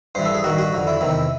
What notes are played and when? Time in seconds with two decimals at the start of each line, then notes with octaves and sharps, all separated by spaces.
0.15 G2 E3 C5
0.25 A4
0.34 G#4
0.44 G2 D#3 F#4
0.58 F#4
0.73 F2 D3
0.87 E4
1.01 E2 C3 D#3